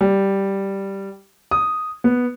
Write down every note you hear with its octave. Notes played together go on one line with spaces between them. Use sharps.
G3
D#6
B3